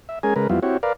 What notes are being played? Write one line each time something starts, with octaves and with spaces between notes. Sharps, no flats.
E5
G#3 C#4 G#4 A#4 G#5
C#3 G#3 A#4 B4
F2 F#3 G3 B3 E4 F4
C4 E4 F#4 G4 C#5
A#4 B4 D5 F5